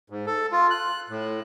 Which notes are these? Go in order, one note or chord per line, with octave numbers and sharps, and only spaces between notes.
G#2
A4
F4
F#6
A2